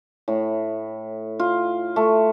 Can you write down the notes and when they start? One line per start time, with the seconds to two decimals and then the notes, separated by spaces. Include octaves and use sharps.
0.28 A2
1.39 F4
1.96 A3